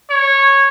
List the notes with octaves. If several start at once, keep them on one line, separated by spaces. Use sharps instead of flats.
C#5